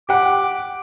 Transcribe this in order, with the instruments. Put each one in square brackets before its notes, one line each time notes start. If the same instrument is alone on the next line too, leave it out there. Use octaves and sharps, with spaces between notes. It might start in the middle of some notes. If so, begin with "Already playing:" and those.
[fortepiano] G4 F#5 [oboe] D6